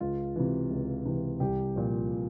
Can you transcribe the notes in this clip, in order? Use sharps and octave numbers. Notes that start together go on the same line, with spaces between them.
C#2 F4
C3 E3
C#2
C3 E3
C2 G4
A#2 F3